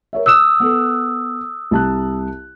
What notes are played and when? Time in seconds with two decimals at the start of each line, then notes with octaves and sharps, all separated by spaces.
0.13 A#4 C#5 E5
0.26 D#6 E6 F#6 E7
0.60 B3 A4
1.71 C2 A5 F#6